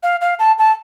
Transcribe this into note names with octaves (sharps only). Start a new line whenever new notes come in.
F5
F5
A5
A5